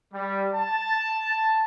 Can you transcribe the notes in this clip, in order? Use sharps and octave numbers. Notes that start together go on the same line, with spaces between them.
G3
A5